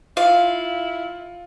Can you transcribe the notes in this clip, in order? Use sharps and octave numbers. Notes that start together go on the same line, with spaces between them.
E4 F4 F5